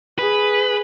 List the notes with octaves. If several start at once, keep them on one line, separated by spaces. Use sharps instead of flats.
G#4 B4